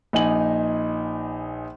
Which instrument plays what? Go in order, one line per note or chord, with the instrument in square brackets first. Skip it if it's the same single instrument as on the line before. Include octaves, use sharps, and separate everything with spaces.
[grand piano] A#1 D#4 D#5 G#5 F#7